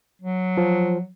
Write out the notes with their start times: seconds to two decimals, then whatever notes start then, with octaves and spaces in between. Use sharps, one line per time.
0.21 F#3
0.57 F3